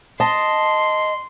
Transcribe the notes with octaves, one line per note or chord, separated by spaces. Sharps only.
D#5 A5 C6